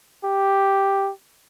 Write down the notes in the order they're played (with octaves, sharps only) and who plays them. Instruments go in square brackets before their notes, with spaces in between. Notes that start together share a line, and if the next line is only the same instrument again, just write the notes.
[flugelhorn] G4